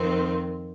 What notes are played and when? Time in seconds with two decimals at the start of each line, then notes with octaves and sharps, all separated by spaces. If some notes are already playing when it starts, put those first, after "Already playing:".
Already playing: F2 D#3 C4